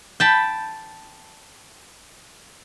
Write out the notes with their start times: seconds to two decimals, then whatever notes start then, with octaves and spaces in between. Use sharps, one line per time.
0.20 G5 A5 B5